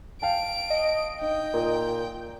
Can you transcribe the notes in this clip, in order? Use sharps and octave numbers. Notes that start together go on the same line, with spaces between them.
F5 G5 A5 D7
D#5
D#4 G5
A#2